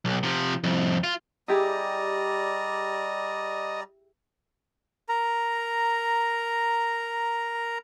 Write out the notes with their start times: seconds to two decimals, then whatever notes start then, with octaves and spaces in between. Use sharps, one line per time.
0.05 B1
0.23 C3 F3
0.64 C2 F2
1.04 F4
1.48 G3 E4 G4 G#4 D5 D#5 A#5
5.09 A#4 A#5